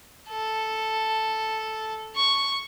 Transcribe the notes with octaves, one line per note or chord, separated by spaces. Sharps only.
A4
C#6